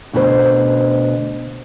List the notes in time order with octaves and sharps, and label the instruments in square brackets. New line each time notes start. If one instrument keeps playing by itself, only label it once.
[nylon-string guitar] D2 B2 C#4 D4 G#4 C5